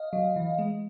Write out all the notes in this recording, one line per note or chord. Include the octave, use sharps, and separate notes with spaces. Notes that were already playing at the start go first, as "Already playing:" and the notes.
Already playing: D#5 F5
F#3
E3
G#3